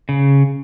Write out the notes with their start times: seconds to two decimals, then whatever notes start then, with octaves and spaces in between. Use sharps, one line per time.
0.09 C#3